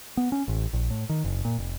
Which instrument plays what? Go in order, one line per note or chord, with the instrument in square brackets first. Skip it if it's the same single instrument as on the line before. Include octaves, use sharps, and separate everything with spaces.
[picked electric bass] B3
C#4
A1
A#1
A2
D#3
F#1
A#2
F1